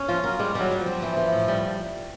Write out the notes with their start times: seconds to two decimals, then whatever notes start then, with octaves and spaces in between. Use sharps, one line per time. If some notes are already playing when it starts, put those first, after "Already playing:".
Already playing: C#4
0.08 F3 F4
0.24 F#3 A#4
0.39 G3 G#3
0.55 F#3 G3
0.71 G3
0.80 F3
0.86 C4
1.02 E3
1.17 E3
1.33 A2
1.48 G3